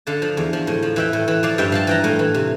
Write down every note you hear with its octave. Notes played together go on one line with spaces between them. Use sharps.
D3 F5 A5
F3
E2
F3
A2
F3
E3 E5 G5
A2
E3
F3 D5 F5
G2 E5 G5
F3 F5 A5
E3 G5 A#5
A2
E3
C3